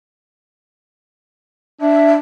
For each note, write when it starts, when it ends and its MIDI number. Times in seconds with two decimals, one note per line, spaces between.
1.81 2.18 62
1.81 2.13 76